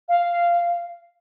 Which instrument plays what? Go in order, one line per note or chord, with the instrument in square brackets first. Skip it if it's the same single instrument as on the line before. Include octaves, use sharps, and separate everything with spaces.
[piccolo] F5